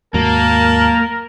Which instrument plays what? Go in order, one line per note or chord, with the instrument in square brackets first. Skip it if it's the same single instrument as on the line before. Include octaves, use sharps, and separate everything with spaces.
[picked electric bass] D#2 G#2 F#3 [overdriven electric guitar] A#3 [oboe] A#4 [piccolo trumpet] A5